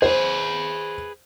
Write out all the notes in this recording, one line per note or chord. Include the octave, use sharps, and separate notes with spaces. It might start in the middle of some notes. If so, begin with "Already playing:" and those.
G#4 B4 C5